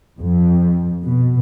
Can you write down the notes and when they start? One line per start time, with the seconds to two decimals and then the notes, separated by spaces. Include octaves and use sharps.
0.20 F2
1.04 B2